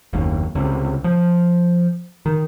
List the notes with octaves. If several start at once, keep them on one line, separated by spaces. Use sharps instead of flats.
F#1 D#2
C#2 C3
F3
D#3